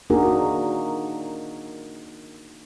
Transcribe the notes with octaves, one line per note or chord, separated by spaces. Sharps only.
A#3 D4 D#4 F#4 G#4 A#4